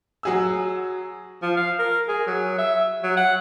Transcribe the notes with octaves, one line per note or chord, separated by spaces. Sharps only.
F#3 G#4 E6
F3
F5
A#4
G#4
F#3
E5
F#3
F#5